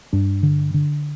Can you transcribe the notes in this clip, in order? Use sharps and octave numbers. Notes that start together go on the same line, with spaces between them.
G2 D4
D3
D3